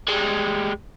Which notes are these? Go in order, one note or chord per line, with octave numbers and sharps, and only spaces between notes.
G3 G#3